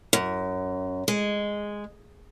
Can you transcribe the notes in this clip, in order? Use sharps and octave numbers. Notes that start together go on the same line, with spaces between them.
F#2
G#3